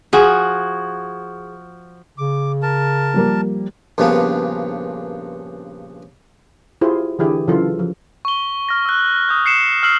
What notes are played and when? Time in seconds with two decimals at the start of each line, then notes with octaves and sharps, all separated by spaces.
0.13 F3 F#4 G#4
2.18 C#3 D6
2.62 A#4 A5
3.14 F3 G3 A#3
3.98 A#1 G2 A#2 C#3 B3
6.81 E4 F4 G4 G#4 C5
7.19 D3 E3 E4 G4 G#4
7.48 C#3 E3 F#3 F4 A4
7.79 F3
8.25 C#6 G7
8.69 F6 A#6
8.85 E6 F#6
9.29 D#6 G6
9.46 C7 C#7 E7
9.83 E6 F6 C7 F#7